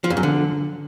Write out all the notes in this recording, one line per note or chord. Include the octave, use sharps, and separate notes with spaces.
F3
F2
F#2
D3